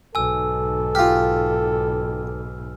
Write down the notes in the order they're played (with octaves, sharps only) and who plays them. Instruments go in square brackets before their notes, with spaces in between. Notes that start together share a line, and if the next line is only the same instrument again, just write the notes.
[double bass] B1 G#2 [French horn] A4 [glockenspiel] G#5 E6
[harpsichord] F4 G4 [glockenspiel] F6